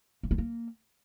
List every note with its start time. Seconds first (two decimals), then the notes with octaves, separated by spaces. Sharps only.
0.23 A#3
0.31 B3
0.38 A#3